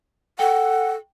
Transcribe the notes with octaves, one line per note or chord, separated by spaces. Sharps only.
A4 F#5 G5